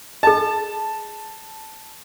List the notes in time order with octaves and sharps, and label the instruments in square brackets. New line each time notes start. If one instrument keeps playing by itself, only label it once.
[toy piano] G#4 D#5 [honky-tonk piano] A5